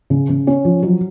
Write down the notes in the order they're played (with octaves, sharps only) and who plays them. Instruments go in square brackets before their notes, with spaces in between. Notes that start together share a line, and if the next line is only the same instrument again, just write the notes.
[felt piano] C#3
C#3
C#4
F3
F#3